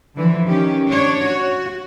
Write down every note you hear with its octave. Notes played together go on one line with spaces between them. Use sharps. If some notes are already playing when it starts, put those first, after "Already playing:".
D3 E3 F3
D#3 C#4 G4
D4 C#5
F#4